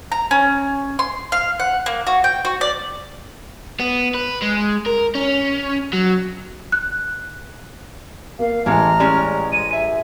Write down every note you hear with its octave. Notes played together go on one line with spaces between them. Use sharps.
A#5
C#4
C6
F5
F#5
A#3
F#4
G5
F#4
D5
B3
B4
G#3
A#4
C#4
F#3
F#6
A#3 F5
A1 E3 G#3 A4 G#5 A#5 F6
G3 G#3 C#4
G#3 D#7
G#4 E5